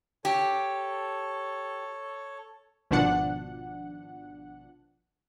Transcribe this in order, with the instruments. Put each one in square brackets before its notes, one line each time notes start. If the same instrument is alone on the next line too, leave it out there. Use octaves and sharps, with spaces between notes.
[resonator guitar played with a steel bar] G4 [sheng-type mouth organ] A4 C#5
[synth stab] G#1 B2 F3 D4 F#5